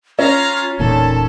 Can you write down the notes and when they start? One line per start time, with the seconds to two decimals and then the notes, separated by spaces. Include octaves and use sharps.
0.19 C#4 F4 F5 A#5
0.79 E1 A#2 D#3 A4 A5